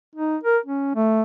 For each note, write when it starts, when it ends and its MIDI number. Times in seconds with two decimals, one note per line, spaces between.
0.15 0.37 63
0.43 0.58 70
0.66 0.92 61
0.95 1.23 57